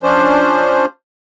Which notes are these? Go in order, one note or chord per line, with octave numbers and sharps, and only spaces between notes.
F3 C#4 D4 C5